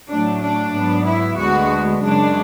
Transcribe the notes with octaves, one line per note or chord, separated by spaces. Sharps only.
A2 F#3 A3 D4
D4
G#2 F#3 B3
E4
D2 D3 G#3 B3 F#4
F#2 C#3 G#3 D4